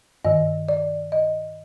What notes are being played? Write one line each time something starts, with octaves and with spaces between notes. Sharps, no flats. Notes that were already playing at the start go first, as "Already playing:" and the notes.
G2 D#3 D#5
D5
D#5